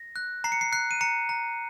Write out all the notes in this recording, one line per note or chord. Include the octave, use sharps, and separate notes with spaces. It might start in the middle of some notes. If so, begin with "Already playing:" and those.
Already playing: A#6
F#6
A#5 C7
C#7
C7
F#6 C7
D#7
A#5 C#7
A#5